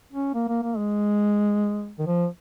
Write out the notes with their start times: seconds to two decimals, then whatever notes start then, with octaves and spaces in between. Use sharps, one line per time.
0.13 C#4
0.34 A#3
0.48 A#3
0.63 A#3
0.77 G#3
1.99 D#3
2.07 F3